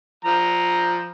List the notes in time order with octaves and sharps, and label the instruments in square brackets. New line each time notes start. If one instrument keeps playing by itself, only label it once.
[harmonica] F3 A#5